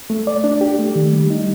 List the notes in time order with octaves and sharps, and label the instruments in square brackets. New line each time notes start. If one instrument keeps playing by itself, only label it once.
[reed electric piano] A3
D5
D4
G4
A3
D#3
G3
D#4